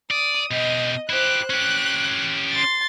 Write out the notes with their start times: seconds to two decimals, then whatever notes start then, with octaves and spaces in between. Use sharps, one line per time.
0.11 D5 D#6
0.51 B2 G4 D#5
1.09 E4 G4 C5 F#6
1.50 C#4 G4 F#6
2.51 C6 A6